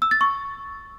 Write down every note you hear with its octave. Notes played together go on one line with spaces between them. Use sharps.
E6
A6
C#6